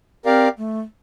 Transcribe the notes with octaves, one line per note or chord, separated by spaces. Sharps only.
C4 G4 A#4 D5 F5
A3